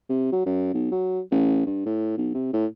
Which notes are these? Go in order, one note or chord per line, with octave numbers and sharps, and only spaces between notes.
C3
F#3
F#2
B1
F#3
A1
G2
A2
B1
C3
A2